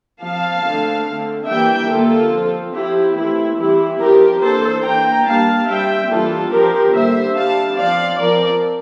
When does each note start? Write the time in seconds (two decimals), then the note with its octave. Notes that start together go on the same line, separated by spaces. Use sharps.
0.22 F3 C4 F5 A5
0.64 D3 A3 C4
1.06 D3 A3 C4
1.48 E3 G3 A#3 D4 E5 G5
1.89 D3 G3 A#3 F4 A4
2.32 F3 C4
2.73 F3 C4 E4 G4
3.15 E3 A3 C4 E4
3.58 E3 G3 C4 E4 G4
3.99 F3 C4 G4 A#4
4.41 E3 A#3 D4 A4 C5
4.83 E3 A#3 D4 G5 A#5
5.25 G3 A#3 D4 F5 A5
5.67 G3 C4 E5 G5
6.09 E3 G3 A#3 D4 F4 A4
6.51 F3 C4 G4 A#4
6.92 D3 G3 A#3 C5 E5
7.35 G3 D4 F5 A5
7.76 F3 C4 D5 F5
8.18 F3 C4 A#4 D5